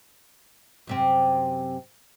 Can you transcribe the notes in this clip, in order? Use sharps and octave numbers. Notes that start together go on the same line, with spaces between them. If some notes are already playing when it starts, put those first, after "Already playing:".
F#2 C3 C4